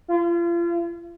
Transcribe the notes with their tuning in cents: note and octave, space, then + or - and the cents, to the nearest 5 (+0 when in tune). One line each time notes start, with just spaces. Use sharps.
F4 -35